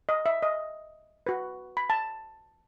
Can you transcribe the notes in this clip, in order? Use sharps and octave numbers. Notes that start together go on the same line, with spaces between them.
D#5
E5
D#5
F#4 B4
B5
A5